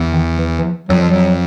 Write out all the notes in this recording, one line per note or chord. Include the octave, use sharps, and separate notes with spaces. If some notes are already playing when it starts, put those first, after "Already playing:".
Already playing: E2
D#3
E3
E3
F3
F2 F#3
F3
F#3